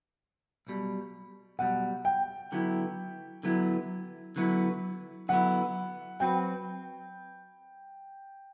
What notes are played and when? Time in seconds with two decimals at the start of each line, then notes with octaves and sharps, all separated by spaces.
0.67 B1 B2 G3
1.59 B1 B2 G3 F#5
2.05 G5
2.52 D3 F#3 B3 E4
3.43 D3 F#3 B3 E4
4.36 D3 F#3 B3 E4
5.29 D3 F#3 B3 E4 F#5
6.20 F#3 C4 F#4 B4 G5